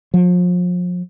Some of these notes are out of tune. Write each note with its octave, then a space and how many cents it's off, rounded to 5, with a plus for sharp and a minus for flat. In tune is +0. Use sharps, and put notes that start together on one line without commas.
F3 +35